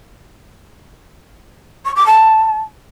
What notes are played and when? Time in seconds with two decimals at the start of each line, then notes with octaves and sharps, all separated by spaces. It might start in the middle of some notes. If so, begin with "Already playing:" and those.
1.85 C#6
1.96 D6
2.06 A5